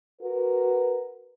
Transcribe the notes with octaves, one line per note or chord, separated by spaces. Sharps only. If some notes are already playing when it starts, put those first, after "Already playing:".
F#4 A#4 B4